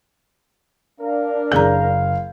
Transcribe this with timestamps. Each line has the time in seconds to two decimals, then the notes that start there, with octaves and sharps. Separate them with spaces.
1.00 D4 A#4 F5
1.52 F#1 G#4 F5 A#5 G6